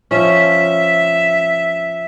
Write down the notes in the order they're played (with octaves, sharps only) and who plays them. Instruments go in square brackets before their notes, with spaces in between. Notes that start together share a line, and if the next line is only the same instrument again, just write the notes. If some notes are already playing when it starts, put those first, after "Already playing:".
[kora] F3 C#4 [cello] E5